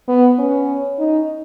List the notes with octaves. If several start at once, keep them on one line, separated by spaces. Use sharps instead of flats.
B3
C#4
D#4